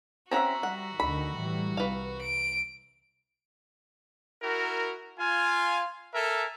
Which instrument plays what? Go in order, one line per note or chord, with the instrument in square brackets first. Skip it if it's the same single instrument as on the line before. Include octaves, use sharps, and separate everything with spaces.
[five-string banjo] C4 C#4 F#5 [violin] F#4 [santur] E5 A#5
[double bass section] G3 [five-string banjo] F#5
[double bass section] D2 D3 D#3 [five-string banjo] B5
[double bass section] A2 E3 G3
[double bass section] C2 [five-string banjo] B4 F5
[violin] D7
[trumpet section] E4 F#4 A#4
F4 G#5
A4 A#4 E5 G#5